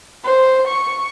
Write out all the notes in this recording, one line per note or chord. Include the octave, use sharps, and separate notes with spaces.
C5
C#6